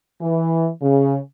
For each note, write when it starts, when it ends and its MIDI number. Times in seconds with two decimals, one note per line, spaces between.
0.20 0.68 52
0.81 1.16 49